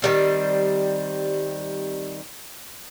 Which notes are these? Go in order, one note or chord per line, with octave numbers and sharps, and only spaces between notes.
D#3 G3 C4